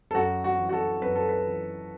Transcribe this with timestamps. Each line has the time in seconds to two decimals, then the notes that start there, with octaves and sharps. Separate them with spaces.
0.11 A4
0.14 F#2 F#4
0.44 F#4
0.58 E3
0.69 F#4
0.73 A4
1.02 F#2 B4
1.15 A4
1.29 B4
1.46 E3